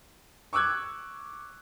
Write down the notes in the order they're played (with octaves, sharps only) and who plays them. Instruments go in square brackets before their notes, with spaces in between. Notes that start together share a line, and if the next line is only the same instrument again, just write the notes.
[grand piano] C#6 D6 E6 F#6 G#6